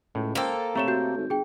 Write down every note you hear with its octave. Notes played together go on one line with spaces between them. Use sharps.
C#2 A2
A#3 A4 A#4 C5 G5
C3 A3 C#5 A#5 C#6 E7
F#4 G6
G#1
G1 G#4 G5